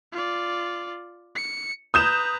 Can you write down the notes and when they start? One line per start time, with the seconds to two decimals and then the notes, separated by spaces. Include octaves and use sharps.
0.12 F4 D5
1.35 C#7
1.94 B4 A#5 D#6 G6 E7